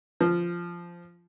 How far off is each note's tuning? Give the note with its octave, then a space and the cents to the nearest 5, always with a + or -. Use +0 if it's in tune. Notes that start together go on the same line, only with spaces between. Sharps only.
F3 -10